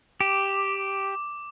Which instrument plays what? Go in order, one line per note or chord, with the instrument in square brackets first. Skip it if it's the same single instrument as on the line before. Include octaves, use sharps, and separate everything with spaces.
[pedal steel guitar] G4 [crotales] D6